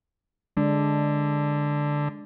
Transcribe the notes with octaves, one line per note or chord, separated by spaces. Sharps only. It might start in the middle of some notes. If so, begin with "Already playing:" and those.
D3 G#3 D4